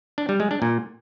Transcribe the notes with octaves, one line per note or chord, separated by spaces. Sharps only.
D4
G3
G#3
D4
A#2